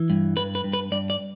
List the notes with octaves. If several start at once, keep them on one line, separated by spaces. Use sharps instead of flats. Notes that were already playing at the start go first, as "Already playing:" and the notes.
Already playing: E3
G2
G2 B4
B4
G2
B4
G2 D5
D5